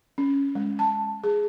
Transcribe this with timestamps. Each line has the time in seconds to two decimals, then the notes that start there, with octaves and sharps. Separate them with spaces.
0.18 C#4
0.55 G#3
0.79 A5
1.24 G#4